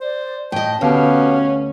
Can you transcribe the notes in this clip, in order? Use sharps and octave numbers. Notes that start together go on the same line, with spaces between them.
C5 D5
A2 D#5 G5 A5
D2 B2 B3 C#4 G4 F5